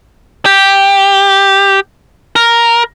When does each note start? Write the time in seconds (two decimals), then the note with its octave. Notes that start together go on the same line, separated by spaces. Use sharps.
0.46 G4
2.36 A#4